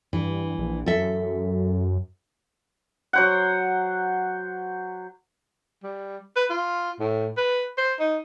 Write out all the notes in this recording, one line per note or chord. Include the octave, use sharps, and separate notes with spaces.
G2 E3
A#1
F#2 A4 E5
F#3 C5 F#5
G3
B4
F4
A2
B4
C5
D#4